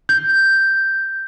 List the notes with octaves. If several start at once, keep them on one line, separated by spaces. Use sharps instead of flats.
G6